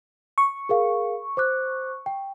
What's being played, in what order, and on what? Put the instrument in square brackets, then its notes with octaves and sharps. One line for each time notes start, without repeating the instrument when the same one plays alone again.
[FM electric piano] C#6
[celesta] G#4 A#4 F5
C5 D6 F#6
G5